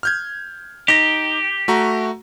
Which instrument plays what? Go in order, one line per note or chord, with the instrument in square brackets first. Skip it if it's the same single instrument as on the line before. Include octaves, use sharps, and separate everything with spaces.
[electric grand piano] F6 G6 G#6
[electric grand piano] D#4 A#6 [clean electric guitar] G4
[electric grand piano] A3 F#4 A#5